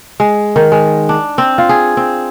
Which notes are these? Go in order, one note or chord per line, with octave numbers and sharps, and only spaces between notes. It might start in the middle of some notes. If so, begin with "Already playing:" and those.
G#3
D#3
G#3
D4
C4
F4
G#4
C4